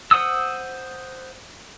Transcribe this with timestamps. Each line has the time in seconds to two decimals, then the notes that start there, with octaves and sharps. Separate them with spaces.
0.11 C5 F#5 D#6 E6